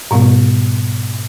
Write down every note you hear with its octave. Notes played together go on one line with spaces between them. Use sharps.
G#2 B2 G3 B3